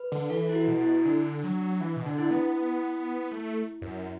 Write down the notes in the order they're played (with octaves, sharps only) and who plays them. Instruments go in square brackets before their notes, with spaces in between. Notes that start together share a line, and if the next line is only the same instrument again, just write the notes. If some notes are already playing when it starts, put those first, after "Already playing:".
Already playing: [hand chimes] B4
[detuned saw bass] D3
[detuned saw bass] E3 [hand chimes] A4
[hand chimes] E4
F#4
[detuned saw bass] B2
[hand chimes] E4
[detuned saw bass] D3 [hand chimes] D4
[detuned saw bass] F#3
E3
B2
[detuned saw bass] D3 [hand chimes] D4
[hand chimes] E4
[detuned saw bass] B3
A3
F#2